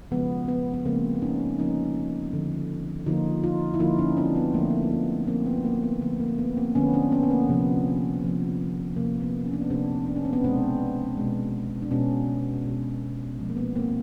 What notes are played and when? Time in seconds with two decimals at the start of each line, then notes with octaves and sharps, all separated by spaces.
0.11 C#3 F3 G#3 B3
0.48 B3
0.74 B3
0.85 C#3 F3 G#3 A#3 C4
1.22 C#4 D#4
1.59 D3 F3 A#3 C#4 D#4
2.33 D3 F3 A#3
3.06 D3 F3 A#3 D#4 F4
3.43 D#4 F4
3.74 E4
3.80 D3 F3 A#3 D#4 F4
3.99 C#4 D#4
4.17 C4 D4
4.36 B3
4.54 D3 F3 A3 A#3
4.71 A#3
4.82 C4
4.91 B3
5.27 D3 F3 A3 A#3 C4
5.46 B3
5.65 A#3
5.83 B3
6.01 D3 F3 A3 B3
6.20 A#3
6.38 B3
6.57 A#3 C4
6.75 D3 F3 A3 B3 C#4
6.93 C4 D4
7.12 B3 C#4
7.23 B3
7.30 A#3 C4
7.49 C3 F3 A#3
8.23 C3 F3 A#3
8.96 C3 F3 A#3
9.21 B3
9.46 C#4
9.53 D4
9.62 B3 C#4
9.70 C3 F3 A#3 C4 D4
10.07 D4
10.16 C#4
10.25 C4
10.33 B3 C#4
10.44 B2 G#3 C4 D4
11.17 B2 G#3
11.82 D4
11.91 B2 G#3 B3 C#4
12.65 B2 G#3
13.39 A#2 F3 G#3
13.50 A#3
13.57 B3
13.76 A#3 C4